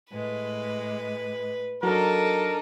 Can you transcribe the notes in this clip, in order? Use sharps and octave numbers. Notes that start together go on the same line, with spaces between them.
A2 G#3 B4
F#3 D4 D#4 A4 A#4